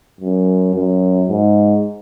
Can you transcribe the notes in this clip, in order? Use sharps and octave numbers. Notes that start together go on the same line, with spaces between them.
F#2
F#2
G#2